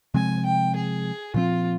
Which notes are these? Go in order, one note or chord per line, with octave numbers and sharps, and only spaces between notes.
C3 F3 G#3 C4 G#5
G5
G#4
A#2 F3 C4 F4